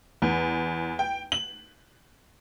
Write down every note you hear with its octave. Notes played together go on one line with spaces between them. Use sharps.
E2
G5
F#7